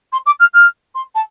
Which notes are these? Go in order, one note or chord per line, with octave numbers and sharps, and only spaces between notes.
C6
D6
F6
F6
C6
A5